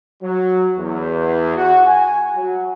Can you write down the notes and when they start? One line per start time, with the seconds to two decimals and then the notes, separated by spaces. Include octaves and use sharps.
0.23 F#3
0.79 E2
1.56 F#4
1.86 G#5
2.35 F#3